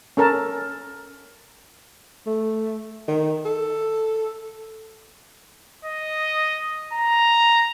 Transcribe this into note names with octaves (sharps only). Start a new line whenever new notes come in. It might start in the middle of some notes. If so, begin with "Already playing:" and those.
C#4 A4 A#4 A5
A3
D#3
A4
D#5
A#5